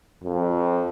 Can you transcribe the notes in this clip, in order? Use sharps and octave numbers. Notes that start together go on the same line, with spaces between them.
F2